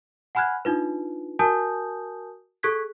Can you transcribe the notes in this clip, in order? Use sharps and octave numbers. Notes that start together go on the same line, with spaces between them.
F#5 G#5 B5 F6 F#6 G#6
D4 D#4 F4 B4
F#4 A#4 G#5 A5 D#6 G6
G#4 A4 C#6 F#6 G#6 B6